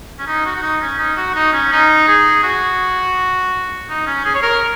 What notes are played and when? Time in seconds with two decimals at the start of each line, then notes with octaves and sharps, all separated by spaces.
0.19 C#4
0.27 D#4
0.46 F#4
0.56 F#4
0.62 D#4
0.82 C#4
0.99 D#4
1.17 F#4
1.35 D#4
1.53 C#4
1.72 D#4
2.08 G#4
2.44 F#4
3.89 D#4
4.07 C#4
4.25 G#4
4.35 C#5
4.43 A#4